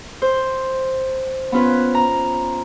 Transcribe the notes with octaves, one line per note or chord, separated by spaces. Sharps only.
C5
B3 C#4 F4 B4
A#5